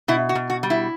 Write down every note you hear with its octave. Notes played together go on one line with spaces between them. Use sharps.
B2 E4
F#4
B2
F#4
G3
E4